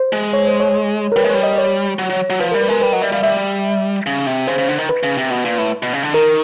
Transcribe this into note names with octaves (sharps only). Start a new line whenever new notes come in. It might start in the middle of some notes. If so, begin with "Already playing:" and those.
Already playing: C5
G#3
C#5
C5
C#5
A#4
G3 B4
G#3
G3 C#5
D#5
C#5
F#3
F#3
F#3
F3 B4
A#4
G3
B4
G#3 A#4
G3 B4
F#3 D#5
G3 E5
G3 F5
G3 E5
C#3
C3
C#3 C5
C#3
D3
D#3
B4
C#3
C3
B2
A#2
A2
B2
C#3
D3
D#3 A#4